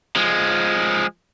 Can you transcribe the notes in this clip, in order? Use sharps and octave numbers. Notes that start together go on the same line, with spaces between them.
F3 G#3